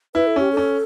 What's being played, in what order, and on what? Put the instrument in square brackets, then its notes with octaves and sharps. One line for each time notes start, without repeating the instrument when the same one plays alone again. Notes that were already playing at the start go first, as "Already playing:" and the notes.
[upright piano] E4 [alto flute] B4
[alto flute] A4
[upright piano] C#4 [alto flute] G4
[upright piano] C#4 [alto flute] A4